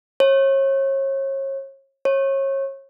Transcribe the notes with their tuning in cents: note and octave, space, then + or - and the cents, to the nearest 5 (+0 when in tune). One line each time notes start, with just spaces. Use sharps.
C#5 -35
C#5 -30